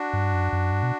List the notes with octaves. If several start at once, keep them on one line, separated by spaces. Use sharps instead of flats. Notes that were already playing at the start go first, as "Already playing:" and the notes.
Already playing: D4 F#4
G2
F#2
F#2
G2
B2